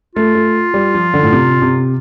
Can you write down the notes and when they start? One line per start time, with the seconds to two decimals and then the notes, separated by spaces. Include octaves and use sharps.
0.15 A3 F4
0.35 A3
0.74 G3
0.94 F3
1.14 D3
1.23 A2
1.33 C3
1.62 C3